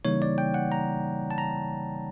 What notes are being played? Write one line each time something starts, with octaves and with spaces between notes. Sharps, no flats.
C#3 E3 G3 A#3 D#4 C#5
D5
G5
F#5
A#5
A5
A#5